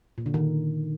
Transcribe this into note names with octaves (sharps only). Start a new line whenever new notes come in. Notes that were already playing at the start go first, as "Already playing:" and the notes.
A#2
D3
D#3